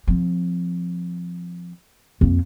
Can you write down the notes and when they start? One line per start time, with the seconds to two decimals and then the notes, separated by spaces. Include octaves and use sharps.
0.07 F3 C4
2.21 F2 A#3